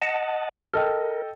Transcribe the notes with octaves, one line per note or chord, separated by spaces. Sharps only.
D#5 F#5 A5
A4 A#4 D#5 G5